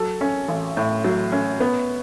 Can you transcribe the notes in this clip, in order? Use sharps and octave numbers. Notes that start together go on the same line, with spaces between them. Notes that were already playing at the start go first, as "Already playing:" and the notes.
Already playing: F#3 A4
C#4
A1
A2
F#3
C#4
B3